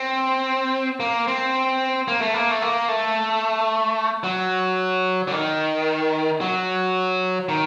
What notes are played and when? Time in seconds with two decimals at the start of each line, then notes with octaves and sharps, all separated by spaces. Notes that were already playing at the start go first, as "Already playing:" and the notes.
Already playing: C4
1.00 A#3
1.27 C4
2.08 A#3
2.21 A3
2.34 A#3
2.51 A3
2.62 A#3
2.88 A3
4.23 F#3
5.28 D3
5.32 D#3
6.41 F#3
7.49 D#3